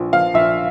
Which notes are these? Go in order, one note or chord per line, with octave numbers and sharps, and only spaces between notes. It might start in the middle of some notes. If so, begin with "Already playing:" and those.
Already playing: A#1 F3
F3 F5
A#1 E5